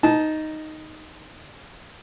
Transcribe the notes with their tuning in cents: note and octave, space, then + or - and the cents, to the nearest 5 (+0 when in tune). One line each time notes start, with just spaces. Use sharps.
D#4 +0 A5 -15